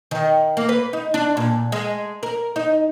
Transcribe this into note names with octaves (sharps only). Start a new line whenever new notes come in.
D#3
A#3
B4
D#4
D4
A#2
G#3
A#4
D#4